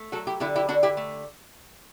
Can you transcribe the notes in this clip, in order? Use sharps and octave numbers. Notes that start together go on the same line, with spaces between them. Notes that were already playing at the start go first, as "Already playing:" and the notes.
Already playing: A3
F#3 F#4 A4
E4 G4
D3 E4 G4
E4 G4
D3 D4 F#4
E4 G4
A3